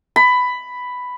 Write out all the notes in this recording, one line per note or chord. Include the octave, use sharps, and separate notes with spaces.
B5